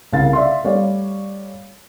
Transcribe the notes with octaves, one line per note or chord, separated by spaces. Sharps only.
C2 C#3 A#4 F5 A6
D5 E5 F5 C6
G3 A3 C#5 D5 F5